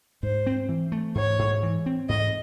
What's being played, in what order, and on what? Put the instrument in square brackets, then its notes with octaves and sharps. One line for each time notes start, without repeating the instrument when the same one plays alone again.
[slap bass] G#2 [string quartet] C5
[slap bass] C4
E3
A3
[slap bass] G#2 [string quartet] C#5
[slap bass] G#2
E3
C4
[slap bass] G#2 [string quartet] D#5